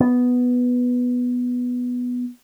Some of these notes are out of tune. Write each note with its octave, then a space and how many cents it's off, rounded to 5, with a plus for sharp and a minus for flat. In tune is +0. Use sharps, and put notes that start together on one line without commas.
B3 +0